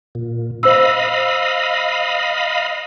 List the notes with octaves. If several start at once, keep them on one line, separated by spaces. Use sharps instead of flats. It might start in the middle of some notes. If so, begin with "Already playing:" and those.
A#2
C5 D#5 F5 B5 E6